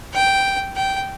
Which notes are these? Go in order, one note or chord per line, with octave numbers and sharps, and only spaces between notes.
G5
G5